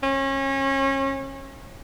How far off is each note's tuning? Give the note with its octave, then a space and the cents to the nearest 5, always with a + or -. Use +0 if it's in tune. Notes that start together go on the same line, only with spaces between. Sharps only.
C#4 -30